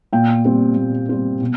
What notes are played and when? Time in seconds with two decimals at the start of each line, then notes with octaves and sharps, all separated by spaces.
0.13 A#2 G5
0.45 G3 C4
0.76 A#2
1.09 G3 C4
1.41 B2